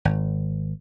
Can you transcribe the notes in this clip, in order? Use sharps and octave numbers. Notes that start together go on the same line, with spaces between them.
G#1